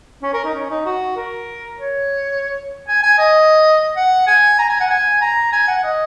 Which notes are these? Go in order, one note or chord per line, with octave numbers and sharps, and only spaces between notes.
C#4
A#4
D#4
C#4
D#4
F#4
A#4
C#5
G#5
G#5
D#5
F#5
G#5
A#5
G#5
F#5
G#5
A#5
G#5
F#5
D#5